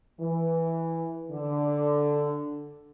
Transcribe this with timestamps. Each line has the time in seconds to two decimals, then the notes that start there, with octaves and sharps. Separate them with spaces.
0.20 E3
1.32 D3